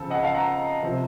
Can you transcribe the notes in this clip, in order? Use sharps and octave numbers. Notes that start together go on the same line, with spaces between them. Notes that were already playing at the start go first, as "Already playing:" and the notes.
Already playing: C#3 F3 C4 A4
D#5 F#5
F5 A5
F#5 A#5
C3 F3 C4